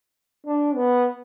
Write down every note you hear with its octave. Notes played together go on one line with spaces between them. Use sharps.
D4
B3